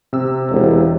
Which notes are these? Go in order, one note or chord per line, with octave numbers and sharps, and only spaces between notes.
C3 E6
E1